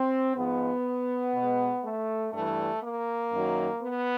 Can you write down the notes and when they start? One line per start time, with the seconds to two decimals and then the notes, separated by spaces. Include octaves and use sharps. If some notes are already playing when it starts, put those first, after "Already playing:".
Already playing: C4
0.35 G#2 F3 G#3 B3
1.35 B2 G#3
1.84 A3
2.34 G2 E3 G3 A3
2.83 A#3
3.33 F#2 D#3 F#3
3.83 B3